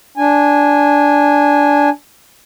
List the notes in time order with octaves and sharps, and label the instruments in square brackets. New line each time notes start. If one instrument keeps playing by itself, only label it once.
[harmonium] D4 G#5